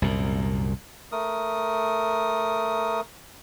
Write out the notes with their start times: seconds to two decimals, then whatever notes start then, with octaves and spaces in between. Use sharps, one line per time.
0.02 C2 F#2 A#2
1.12 A3 A#4 D#6